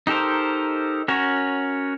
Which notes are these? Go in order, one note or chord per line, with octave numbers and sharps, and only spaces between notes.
D#4 G4 A4 A#4 C5
C#4 F#4 A#4 C#5